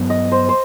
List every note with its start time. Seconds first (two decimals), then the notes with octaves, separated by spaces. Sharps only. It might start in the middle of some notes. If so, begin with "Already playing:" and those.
Already playing: G2 F#3 B3
0.10 D#5
0.32 C5
0.49 C5